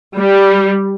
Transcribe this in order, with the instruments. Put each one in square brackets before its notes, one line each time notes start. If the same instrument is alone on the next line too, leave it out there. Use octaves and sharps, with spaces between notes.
[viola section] G3